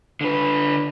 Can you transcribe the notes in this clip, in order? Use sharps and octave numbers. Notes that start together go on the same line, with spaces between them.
D3 B4